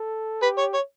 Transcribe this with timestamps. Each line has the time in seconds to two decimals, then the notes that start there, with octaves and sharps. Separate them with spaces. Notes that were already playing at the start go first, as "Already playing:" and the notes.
Already playing: A4
0.42 G4 B4
0.58 C#5
0.74 C#5